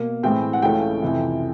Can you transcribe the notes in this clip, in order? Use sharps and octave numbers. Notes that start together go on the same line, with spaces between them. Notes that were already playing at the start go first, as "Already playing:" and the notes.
Already playing: B2 A#3
A2 E3 G#3 C4 G5
F#5
C#2 C#3 E3 A3 C#4 G5
F2 C3 E3